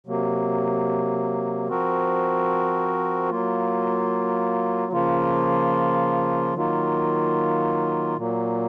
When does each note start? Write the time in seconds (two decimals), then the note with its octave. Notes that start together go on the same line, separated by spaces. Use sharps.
0.06 C3 F#3 A#3
1.68 F3 C4 F#4 A#4
3.30 F#3 A#3 F4
4.92 C#3 F3 A#3 F4
6.55 D#3 F#3 A#3 F4
8.17 A#2 F#3 A#3